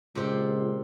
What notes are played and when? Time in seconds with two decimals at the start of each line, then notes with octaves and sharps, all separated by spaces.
0.15 C#2 A#2 C4 G4